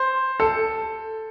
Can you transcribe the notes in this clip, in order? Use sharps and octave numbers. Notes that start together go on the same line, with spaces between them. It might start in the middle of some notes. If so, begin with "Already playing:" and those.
Already playing: C5
A4